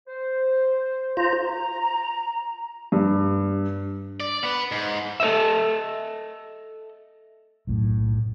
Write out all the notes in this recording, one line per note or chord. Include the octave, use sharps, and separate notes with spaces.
C5
F4 C5 A#5
A#5
G2
D5
B3 B4
G#2
A4 C5 D#5 E5
B1 F#2 A2